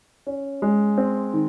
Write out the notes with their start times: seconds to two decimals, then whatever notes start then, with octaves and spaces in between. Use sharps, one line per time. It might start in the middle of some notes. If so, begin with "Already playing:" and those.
0.27 C#4
0.62 G#3
0.98 C4
1.34 D#3